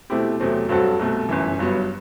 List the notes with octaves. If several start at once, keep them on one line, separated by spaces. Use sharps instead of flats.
B2 A3 C4 E4 G4
E2 C3 F#3 A3 C4
G2 F#3 C4 F#4 A4
C2 B2 A3
G1 F#2 E3
G1 G2 F#3 B3